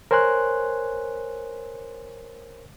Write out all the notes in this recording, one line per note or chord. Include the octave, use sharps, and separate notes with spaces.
A#4 C5 C#5 G#5 C6 F#6